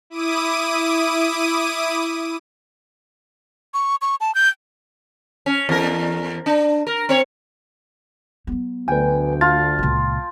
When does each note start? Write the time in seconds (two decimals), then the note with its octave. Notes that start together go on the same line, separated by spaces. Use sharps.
0.10 E4 D6 D#6 D#7
3.74 C#6
4.02 C#6
4.21 A5
4.35 G6
5.46 C#4
5.69 E2 A#4
6.46 D4
6.87 A#4
7.09 C4 C#5
8.47 F#3 B3
8.88 D2 B4 G5 G#5
9.41 F4 A5 A6
9.79 C#2 A#2